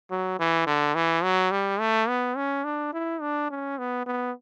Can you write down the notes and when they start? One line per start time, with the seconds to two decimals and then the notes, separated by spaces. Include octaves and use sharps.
0.11 F#3
0.39 E3
0.67 D3
0.95 E3
1.23 F#3
1.51 G3
1.80 A3
2.08 B3
2.37 C#4
2.64 D4
2.93 E4
3.21 D4
3.50 C#4
3.78 B3
4.06 B3